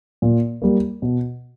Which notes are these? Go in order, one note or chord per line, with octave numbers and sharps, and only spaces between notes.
A#2
G3 A#3
B2